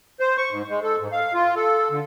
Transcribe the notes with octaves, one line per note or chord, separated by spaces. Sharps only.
C5
C#6
G#2
G#3
A4
G#2
F5
F4
A4
D3